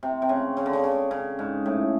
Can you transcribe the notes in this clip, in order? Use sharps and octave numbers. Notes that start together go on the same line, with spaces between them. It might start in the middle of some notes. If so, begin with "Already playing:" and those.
C3
C3
C#3
C#3
D3
C#3
C#3
C#3
G#2
A2